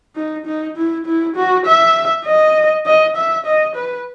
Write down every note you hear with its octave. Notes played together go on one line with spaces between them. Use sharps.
D#4
D#4
E4
E4
F#4
E5
D#5
D#5
E5
D#5
B4